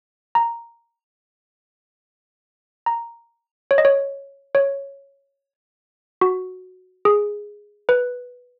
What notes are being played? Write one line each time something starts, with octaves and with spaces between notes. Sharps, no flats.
A#5
A#5
C#5
D#5
C#5
C#5
F#4
G#4
B4